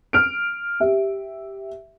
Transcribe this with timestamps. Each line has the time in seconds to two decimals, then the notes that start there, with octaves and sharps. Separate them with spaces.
0.13 F6 D7
0.80 G4 E5